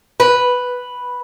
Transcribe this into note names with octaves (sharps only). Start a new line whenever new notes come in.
B4